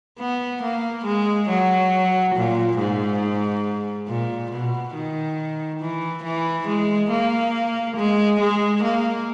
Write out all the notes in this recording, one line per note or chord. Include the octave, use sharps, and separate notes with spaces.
B3
A#3
G#3
F#3
A#2
G#2
A#2
B2
D#3
E3
E3
G#3
A#3
G#3
G#3
A#3